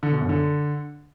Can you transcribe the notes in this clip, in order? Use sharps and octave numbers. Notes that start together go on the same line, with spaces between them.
D3
B2
F#2
D3